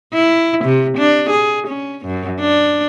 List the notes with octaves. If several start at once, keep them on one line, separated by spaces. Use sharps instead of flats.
E4
C3
D4
G#4
C#4
F#2
D4